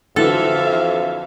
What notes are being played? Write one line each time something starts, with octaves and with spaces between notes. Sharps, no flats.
F2 D3 E3 F#3 A4 E5 F5